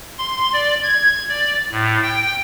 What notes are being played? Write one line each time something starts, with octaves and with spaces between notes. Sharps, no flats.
C6
D5
G#6
D5
A2
G5